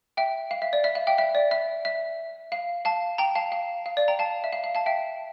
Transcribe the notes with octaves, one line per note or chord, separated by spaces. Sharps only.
E5 G5
F5
E5
D5
E5
F5
E5 G5
E5
D5
E5
E5
F5
F5 A5
G5 A#5
F5 A5
F5
F5
D5
G5 A#5
F5 A5
E5
F5
F5
F5 A5
E5 G5